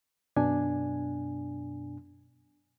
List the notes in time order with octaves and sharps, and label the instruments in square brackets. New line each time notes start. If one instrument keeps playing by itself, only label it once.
[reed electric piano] F#2 B2 D4 G#5